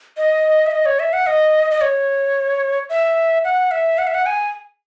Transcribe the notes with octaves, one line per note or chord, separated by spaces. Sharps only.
D#5
E5
D#5
C#5
E5
F#5
D#5
D#5
C#5
E5
F#5
E5
F#5
E5
F#5
G#5